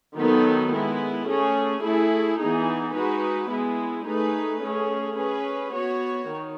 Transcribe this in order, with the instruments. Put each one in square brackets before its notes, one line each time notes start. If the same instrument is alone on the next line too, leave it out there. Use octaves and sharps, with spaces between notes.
[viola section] D#3 F#3 B3 D#4 A4
G#3 B3 E4
A3 C#4 G#4
A3 E4 G#4
E3 B3 D#4 G#4
G#3 D#4 F#4 B4
G#3 B3 E4
A3 D#4 G#4 B4
A3 C#4 G#4
C#4 G#4 B4
B3 F#4 C#5
D#3